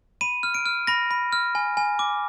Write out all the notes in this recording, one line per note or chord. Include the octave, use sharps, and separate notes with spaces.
B5 D#7
F6
D7
F6
B5 A#6
B5
F6
G#5
G#5
D6